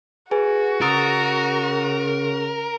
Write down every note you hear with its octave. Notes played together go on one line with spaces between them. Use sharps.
F#4 G#4 B4 G#5
C#3 A#4 D#6 E6 A6